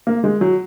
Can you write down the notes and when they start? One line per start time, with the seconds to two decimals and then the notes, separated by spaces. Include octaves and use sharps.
0.07 A#3
0.24 G#3
0.41 F#3